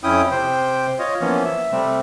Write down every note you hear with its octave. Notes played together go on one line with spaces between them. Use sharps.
F2 C#4 E4 G5 D#6
C3 C5 G5
F4 C#5 D#5
E3 F3 A#3 B3 C#4
E5
C3 G3 A3 C4